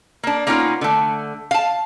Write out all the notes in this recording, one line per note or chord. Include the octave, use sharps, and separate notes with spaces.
A#3 D4
A#3 B3 C#4 D#4 F4
D3 A3
F5 A5